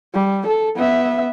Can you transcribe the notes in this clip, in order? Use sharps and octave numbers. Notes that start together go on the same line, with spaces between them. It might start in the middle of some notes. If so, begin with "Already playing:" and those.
G3
A4
B3 E5